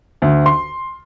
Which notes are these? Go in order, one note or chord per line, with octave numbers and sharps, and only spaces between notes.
D2
C6